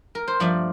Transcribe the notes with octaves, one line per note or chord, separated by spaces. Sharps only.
A#4
C5
G2 F3 A3 D5